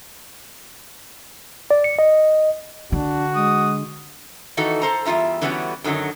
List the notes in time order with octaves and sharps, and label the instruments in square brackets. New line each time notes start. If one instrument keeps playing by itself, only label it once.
[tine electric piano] D5
C#7
D#5
[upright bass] D3 [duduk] D4 [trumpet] F#4
[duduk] G#3 [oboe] D#6
[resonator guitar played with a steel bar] D#3 E3 D#4 F#4 A4
A4 C5 A#5
E2 G3 F4 E5 A#5
D3 E3 G3 B3 C#4 F#4
F#2 D3 D#3 F#3